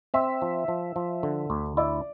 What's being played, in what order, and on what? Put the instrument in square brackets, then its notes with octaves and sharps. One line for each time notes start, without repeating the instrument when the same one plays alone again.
[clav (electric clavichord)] C4 [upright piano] E5
[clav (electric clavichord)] F3
F3
F3
D3
D2
[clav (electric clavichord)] E4 [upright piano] D5